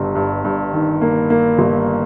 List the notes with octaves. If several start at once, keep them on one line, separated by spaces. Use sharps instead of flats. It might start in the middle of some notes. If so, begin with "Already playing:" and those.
Already playing: G1 G2
G2
G2
D#3
A#3
A#3
G1